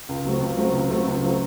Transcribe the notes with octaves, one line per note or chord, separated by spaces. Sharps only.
C#2
C#3 F#3 A3 C4
C#2
C#3 F#3 A3 C4
C#2
C#3 F#3 A3 C4
C#2
C#3 F#3 A3 C4